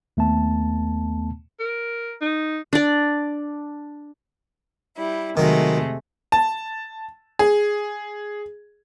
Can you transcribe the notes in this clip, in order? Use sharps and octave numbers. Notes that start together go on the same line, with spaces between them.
D#2 A3 B3 A5
A#4
D#4
D4 D5
G3 E4
C3 D#3 F#3 G#3 A3
A5
G#4